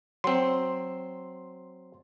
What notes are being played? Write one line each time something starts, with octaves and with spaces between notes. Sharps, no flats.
F#3 C4 C6